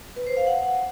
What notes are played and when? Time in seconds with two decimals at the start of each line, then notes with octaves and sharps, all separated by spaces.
0.16 B4
0.27 C5
0.37 F5
0.47 F#5